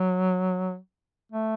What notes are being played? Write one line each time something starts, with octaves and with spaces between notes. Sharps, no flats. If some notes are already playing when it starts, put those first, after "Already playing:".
Already playing: F#3
A3